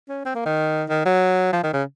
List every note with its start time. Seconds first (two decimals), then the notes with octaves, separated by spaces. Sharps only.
0.09 C#4
0.25 C4
0.35 A#3
0.46 D#3
0.89 D#3
1.05 F#3
1.53 F3
1.63 D#3
1.73 C#3